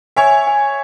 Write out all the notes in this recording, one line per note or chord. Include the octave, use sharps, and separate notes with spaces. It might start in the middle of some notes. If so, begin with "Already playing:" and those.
C#5 E5 G#5
G#5